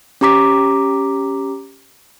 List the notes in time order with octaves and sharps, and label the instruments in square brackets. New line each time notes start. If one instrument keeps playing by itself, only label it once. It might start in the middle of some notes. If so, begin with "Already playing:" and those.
[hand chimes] C#4 G4 A#5 D6 B6